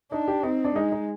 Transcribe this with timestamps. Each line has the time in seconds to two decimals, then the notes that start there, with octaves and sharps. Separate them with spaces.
0.12 D4 D#4
0.28 G4
0.43 C4 D#4
0.65 D4
0.76 G#3 D#4
0.92 D#4